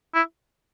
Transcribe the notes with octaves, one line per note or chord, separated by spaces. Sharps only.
E4